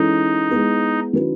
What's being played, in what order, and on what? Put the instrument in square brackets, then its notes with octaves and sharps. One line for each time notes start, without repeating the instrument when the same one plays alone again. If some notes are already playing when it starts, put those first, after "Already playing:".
Already playing: [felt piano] E3 G#3 C#4 E4 A4 [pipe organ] D#4
[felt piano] G#3 B3 E4
D#3 F#3 C#4 E4 B4